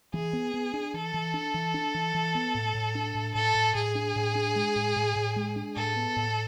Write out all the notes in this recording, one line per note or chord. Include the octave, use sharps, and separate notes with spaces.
E3 G#4
B3
B3
D4
E3 A4
E3
D4
E3
D4
E3
E3
B3
A2
A2
D4
A2
A2 A4
A2
A2 G#4
D4
A2
D4
G#3
A2
A2
A2
G#3
D4
A2 A4
B3
A2